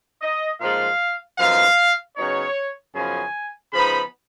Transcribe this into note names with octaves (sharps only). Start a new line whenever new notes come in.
D#5
A#2 F3 G#3 D#4 F5
F#2 F3 B3 D#4 F5
C#3 F#3 B3 D#4 C#5
F#2 C#3 F3 B3 D#4 G#5
C#3 F3 B3 D#4 B5